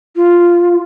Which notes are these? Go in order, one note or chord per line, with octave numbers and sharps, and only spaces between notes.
F4